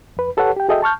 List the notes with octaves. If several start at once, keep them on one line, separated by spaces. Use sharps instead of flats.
F2 B4
G4 A4 B4 C#5 F#5
G4 G5
F#4 G#4 A4 D#5 E5 G5
A5 C#6 F6 G6